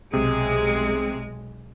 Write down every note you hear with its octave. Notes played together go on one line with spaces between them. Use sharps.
B1 C3 G#3 G#4